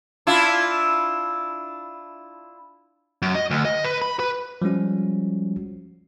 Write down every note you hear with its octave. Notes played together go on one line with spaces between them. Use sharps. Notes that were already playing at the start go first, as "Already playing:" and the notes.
D4 E4 F4
F#2
D#5
D2
D#5
B4
B5
B4
F3 G3 G#3 C#4 F#4